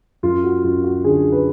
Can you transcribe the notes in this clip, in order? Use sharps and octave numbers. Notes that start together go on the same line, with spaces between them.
F#2 F4
F#4
F#2 F4
F#4
D3 G#4
B4